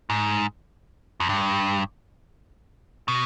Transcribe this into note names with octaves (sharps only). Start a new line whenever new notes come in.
G#2
F2
G2
B2